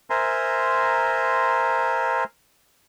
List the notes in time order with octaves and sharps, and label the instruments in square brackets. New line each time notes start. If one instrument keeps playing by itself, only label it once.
[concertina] A#4 C5 E5 G#5 A#5 C6